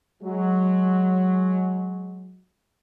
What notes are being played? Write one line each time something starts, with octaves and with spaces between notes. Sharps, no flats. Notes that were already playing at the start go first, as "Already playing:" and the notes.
F#3 G#3